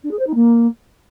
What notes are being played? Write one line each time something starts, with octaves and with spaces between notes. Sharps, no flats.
D4
G#4
C5
D#4
A#3